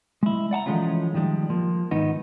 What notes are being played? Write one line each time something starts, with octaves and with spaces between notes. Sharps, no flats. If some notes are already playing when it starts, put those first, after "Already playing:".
G#3 E4
D5 F#5 A5 A#5
E3 F3 G#3 A3 C#4 F4
D#3 F3 G3 G#3
F3 A#3
G#2 D#3 B3 D#4